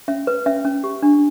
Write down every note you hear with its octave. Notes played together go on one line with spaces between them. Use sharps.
C#4 E5
B4
C#4 E5
C#4
G4
D4